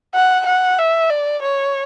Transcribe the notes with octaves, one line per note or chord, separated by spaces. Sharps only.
F#5
F#5
E5
D5
C#5